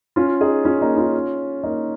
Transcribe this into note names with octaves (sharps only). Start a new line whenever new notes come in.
C#4 F4
D#4 G#4
C#4 F4
A#3 D#4
C#4 F4
A#3 D#4